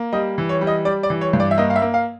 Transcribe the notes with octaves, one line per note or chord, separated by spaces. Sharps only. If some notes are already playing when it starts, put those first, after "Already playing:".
Already playing: A#3
G3 D#5
E3
C#5
G3
D#5
G3 D5
D5
E3
C#5
G2
D5
E5
A#3 D#5
F5
E5
A#3
F5